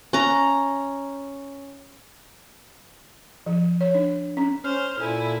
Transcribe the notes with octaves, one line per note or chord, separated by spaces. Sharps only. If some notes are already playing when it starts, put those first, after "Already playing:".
C#4 A#5
F3
C#5
D4
C#4
C#4 C5 F6
A#2 E4 A4 G#5